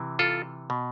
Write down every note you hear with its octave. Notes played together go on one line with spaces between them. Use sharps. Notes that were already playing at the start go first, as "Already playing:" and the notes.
Already playing: C3 E3
F4 A4
B2